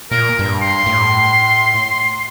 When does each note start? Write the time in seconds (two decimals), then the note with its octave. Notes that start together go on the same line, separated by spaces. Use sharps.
0.11 A#2 A#4
0.39 G2
0.62 C6
0.86 A2